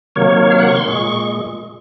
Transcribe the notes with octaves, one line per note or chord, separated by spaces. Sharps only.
C3 D#3 F#3 A#3 C#5
F5
F#5
C#6
C6
A#2 G#3 C#6